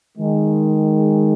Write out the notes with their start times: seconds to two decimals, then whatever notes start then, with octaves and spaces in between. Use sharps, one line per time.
0.18 D#3 G#3